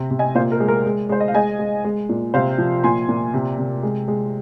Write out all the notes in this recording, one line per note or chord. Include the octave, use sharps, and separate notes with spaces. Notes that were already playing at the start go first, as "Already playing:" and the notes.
Already playing: C3
C3
D#5 G#5
A#2 C5 F5
A#4
G#3
A#4
G#3
G#3 C5
D#5
F5
G#3 D#5 G#5
G#3
G#3
A#2
C3 C5 F5
F3
A#2 G#5 C6
A#2
C3
C3
G#3
G#3